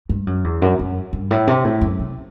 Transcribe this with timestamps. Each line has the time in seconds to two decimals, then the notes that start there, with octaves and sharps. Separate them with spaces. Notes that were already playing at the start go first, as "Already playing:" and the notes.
0.09 G2
0.27 F#2
0.44 E2
0.62 F#2
0.79 F#2
1.13 G2
1.31 A2
1.47 C3
1.65 A2
1.81 F#2
1.99 C3